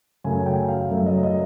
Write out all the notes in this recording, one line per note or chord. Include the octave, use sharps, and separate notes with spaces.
F#2 C#3 F#3 A3 G#5
G5
F5
F#2 C#3 F#3 A3 E5
D#5
D#5